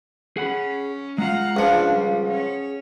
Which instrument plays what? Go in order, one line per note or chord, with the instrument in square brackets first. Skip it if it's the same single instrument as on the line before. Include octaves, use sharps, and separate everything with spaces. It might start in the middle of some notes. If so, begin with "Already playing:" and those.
[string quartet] C#4 [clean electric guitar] G#4 F#5 B5
[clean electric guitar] G#3 F4 [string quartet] F5 F#5 A#5
[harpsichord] C#2 F3 [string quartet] D4 [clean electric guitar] G#4 F#5
[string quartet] G3
C#4 C#5